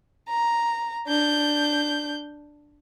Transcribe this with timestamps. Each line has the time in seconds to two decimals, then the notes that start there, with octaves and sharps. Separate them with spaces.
0.29 A#5
1.07 D4 G6